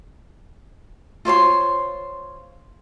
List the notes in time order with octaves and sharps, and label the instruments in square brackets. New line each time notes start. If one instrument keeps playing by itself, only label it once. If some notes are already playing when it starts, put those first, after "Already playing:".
[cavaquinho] F4 C5 C#5 C6